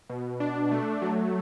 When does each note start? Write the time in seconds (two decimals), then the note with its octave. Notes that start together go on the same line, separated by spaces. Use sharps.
0.10 B2
0.40 D4
0.71 A3
1.02 F#3